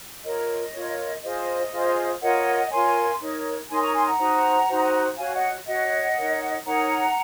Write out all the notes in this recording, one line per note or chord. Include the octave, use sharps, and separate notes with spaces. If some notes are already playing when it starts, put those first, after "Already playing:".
F4 A#4 C#5 D#5
F4 A#4 C#5
F4 G#4 C5 D#5
F4 G#4 C5
F4 A#4 C#5 D#5 F#5
F4 A#4 C#5 G#5 C6
D#4 A#4 C#5
D#4 A#4 C#5 G#5 C6
A#5 C#6
G#5 C6
F#5 A#5
D#4 F#4 C5
D#4 F#4 C5
F#4 C#5 F5 G#5
D#5 F#5
F#4 C#5 D#5 F#5
D#4 A#4 C#5
D#4 A#4 C#5 F#5 A#5